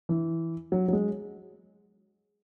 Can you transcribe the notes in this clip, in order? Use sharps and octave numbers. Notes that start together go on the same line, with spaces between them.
E3
F#3
F#3
G#3